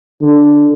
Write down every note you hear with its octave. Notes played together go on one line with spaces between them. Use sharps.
D3